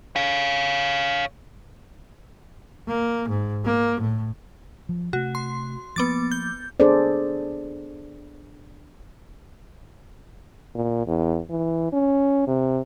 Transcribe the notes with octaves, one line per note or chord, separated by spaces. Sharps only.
C#5 F5
A#3
G#2
A#3
A2
F3
C3 A3 F#4
C6
F3 A#3 B3 D6 A6
G6
B3 D4 G#4 A4 C5 D5
A#2
E2
E3
C#4
C3